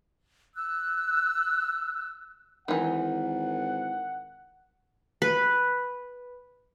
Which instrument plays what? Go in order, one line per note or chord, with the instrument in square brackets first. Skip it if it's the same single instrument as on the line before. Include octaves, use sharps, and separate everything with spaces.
[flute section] E6 F#6
[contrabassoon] G#1 [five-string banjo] D#3 E3 [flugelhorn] F#5
[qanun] B4